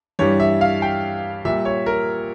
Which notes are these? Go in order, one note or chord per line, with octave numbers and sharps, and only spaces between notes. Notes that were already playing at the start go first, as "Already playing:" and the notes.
G2 E3 G3 C#5
E5
F5
G5
A#2 G3 E5
C#5
A#4